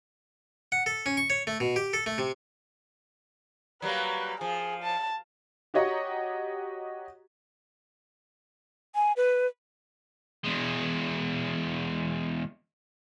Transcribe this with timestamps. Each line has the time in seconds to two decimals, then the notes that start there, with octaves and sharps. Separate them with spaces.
0.72 F#5
0.86 A4
1.06 C#4
1.17 C#6
1.30 C#5
1.47 A3
1.60 B2
1.76 G4
1.93 A4
2.06 A3
2.18 C3
3.82 F#3 G3 A#3 B4
4.41 F3 G#4
4.84 A5
5.74 F#4 G4 C#5 D#5 F#5 A#5
8.95 G#5
9.17 B4
10.45 E2 G#3